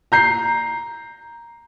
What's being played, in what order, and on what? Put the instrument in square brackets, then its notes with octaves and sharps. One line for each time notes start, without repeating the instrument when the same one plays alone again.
[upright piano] A#5 G6 C7